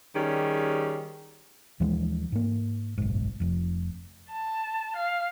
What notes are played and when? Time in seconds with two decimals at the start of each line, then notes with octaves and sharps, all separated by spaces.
0.16 D#3 G3 C#4 G4 G#4
1.80 D#2 E3 F3 G#3
2.32 G#2 A#3
2.98 F#1 B1 G#2
3.40 F1 F2
4.30 A5
4.96 F5